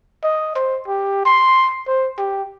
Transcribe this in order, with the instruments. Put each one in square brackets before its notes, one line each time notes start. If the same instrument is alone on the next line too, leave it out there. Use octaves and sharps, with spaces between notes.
[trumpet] D#5
C5
G4
C6
C5
G4